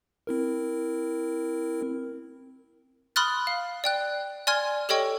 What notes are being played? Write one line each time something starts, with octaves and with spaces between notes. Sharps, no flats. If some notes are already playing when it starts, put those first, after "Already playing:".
C4 E4 A#4
B5 C6 D#6 F6 F#6 A6
F5
D5 G5 F#6
D5 G#5 C6 F6 G#6
G4 A4 C#5 D#5 G5 C#6